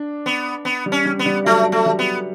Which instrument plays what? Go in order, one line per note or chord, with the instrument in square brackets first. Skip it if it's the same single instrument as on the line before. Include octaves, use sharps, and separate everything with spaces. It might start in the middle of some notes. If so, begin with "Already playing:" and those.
Already playing: [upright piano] D4
[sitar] B3
B3
[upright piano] G3
[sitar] C#4
[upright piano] G3
[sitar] B3
[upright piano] G3
[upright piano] F#3 [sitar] A3
[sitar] A3
[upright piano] G3
[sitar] B3